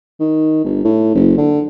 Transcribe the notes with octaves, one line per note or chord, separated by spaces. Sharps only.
D#3
G1
A2
F#1
D3